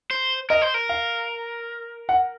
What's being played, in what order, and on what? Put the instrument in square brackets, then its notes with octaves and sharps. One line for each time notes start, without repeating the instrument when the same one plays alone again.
[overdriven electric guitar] C5
[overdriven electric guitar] A#4 [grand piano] D#5
[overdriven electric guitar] C5
A#4
[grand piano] F5
F#5